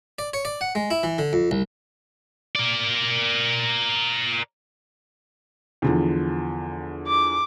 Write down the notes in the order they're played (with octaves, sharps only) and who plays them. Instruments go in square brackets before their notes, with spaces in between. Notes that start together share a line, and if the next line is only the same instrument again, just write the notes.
[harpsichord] D5
C#5
D5
F#5
G#3
E4
E3
D3
F2
C2
[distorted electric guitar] A#4 D5
[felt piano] E2 D3 F3
[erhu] D6